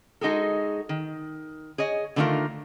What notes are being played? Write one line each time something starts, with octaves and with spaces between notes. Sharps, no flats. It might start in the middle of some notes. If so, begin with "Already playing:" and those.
G#3 D#4 F#4 G#4 A4
D#3
G#4 C#5 D#5
D3 D#3 A3 D#4 F4 A#4